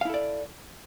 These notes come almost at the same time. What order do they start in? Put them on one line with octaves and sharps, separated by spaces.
F5 E4 A4 D5